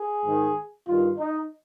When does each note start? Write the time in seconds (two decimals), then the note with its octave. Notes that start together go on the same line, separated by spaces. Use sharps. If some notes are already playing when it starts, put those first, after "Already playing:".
Already playing: G#4
0.24 G#2 D#3
0.87 G2 D#3 F4
1.18 D#4